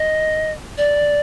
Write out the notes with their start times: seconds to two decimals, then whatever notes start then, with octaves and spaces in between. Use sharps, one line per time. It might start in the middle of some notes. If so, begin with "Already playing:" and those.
Already playing: D#5
0.78 D5